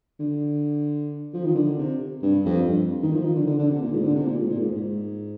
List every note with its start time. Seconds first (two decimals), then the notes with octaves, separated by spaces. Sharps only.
0.19 D3
1.34 F3
1.45 D#3
1.55 D3
1.78 C3
2.22 G2
2.45 F2
2.68 G2
3.02 D#3
3.13 F3
3.24 D#3
3.35 D3
3.47 D3
3.59 D3
3.70 C3
3.82 A#2
3.92 G#2
4.03 D3
4.15 C3
4.26 A#2
4.37 G#2
4.49 A#2
4.60 G#2
4.72 G#2